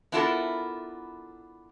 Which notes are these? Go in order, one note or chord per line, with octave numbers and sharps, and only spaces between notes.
B3 D4 E4 F4 A4 A#4